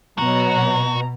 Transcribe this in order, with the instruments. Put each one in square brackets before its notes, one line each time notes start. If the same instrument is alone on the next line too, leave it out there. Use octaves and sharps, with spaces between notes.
[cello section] B2 [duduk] F#3 [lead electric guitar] F#4 [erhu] A#5